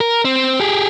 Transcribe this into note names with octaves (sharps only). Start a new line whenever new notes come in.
A#4
C4
G4 G#4